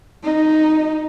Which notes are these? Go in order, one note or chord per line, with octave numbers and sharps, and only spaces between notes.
D#4